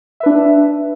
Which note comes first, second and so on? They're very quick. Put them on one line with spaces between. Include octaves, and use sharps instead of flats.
E5 B4 D4